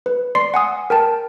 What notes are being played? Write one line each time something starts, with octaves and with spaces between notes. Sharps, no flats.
B4
D5 C6 C7
F#5 G#5 D#6
A#4 G5 A5